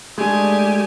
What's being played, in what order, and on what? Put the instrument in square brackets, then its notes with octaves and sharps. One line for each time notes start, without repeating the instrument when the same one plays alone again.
[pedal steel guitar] G#3 A3 [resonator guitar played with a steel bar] D4 G#4 [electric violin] G4 G#5